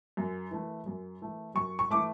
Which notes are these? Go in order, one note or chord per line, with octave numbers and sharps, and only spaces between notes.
F#2
E3 A3
F#2
E3 A3
F#2 C#6
C#6
E3 A3 D6